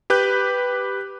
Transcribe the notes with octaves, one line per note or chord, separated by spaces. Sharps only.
G4 B4 F#6 G6